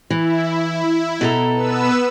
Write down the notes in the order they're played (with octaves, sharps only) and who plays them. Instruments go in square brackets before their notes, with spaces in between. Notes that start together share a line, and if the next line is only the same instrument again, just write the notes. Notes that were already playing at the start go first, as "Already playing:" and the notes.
[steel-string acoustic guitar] E3 [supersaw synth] E4
[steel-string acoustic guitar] B2 A4 A#5
[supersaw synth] B3 B4 E6